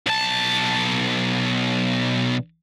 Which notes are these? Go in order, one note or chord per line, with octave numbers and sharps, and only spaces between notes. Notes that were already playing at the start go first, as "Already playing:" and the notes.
B1 A5